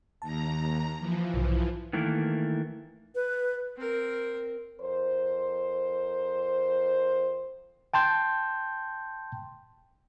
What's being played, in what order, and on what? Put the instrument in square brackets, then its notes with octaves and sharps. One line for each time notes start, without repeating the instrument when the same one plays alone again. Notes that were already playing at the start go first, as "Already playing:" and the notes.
[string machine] D#2 A#5 [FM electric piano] A5
[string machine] E3 F3
[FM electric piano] B1 G#2 C3
[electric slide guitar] D#3 E3 A3 A#3
[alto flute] B4
[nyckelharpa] C4 A#4
[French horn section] F2 A#4 C5
[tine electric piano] G5 A5 C6 G6